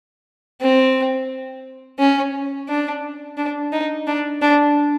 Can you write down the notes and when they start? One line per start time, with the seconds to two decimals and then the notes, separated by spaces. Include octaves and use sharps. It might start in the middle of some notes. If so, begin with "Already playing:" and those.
0.61 C4
1.99 C#4
2.69 D4
3.38 D4
3.72 D#4
4.07 D4
4.42 D4